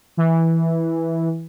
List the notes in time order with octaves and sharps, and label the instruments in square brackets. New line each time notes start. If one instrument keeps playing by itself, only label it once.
[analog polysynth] E3